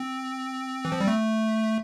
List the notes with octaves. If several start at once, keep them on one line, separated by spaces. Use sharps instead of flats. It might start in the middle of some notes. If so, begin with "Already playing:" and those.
Already playing: C4
E3
F3
G3
A3